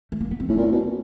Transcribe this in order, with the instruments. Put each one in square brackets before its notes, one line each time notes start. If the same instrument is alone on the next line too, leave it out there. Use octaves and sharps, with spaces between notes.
[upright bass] A3
A#3
B3
C4
[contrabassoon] A2 [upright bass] C#4
[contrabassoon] A#2
A2
B2